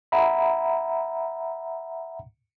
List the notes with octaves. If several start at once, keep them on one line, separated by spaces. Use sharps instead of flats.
E5 F#5 A#5 B5